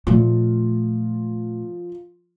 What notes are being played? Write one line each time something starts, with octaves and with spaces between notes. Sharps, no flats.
A#2 F3 A3 F4